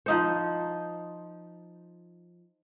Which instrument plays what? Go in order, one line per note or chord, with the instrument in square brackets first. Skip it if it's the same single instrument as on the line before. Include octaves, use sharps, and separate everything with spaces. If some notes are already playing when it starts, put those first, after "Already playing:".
[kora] F3 D#4 C5